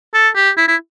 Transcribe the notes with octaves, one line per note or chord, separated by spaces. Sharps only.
A4
G4
E4
E4